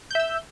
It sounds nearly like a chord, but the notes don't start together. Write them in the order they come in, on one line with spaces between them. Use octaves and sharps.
G6 E5 E6